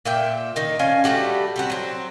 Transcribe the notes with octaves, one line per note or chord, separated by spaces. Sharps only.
A#2 E5 G5
D#3 D#4
C#4 D4 F4 G#5
G3 A3 F#4 G4
G3 C4 F#4
F#3 C4